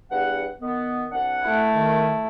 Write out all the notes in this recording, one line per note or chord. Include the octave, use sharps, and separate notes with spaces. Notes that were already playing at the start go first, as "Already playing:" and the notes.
E2 G2 F#5
D#3 B3
C2 D4 F#5
A3 E4
D#3